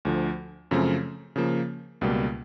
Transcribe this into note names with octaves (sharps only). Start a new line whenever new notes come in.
D2 D3 F3
F#2 C#3 F3 A3 C4
C#3 F3 A#3
C#2 B2 G3 A#3